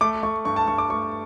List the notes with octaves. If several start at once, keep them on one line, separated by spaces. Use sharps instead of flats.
A3 D6
A3 C#6
G2 C#6
A5
G2 C#6
D6
A3 C#6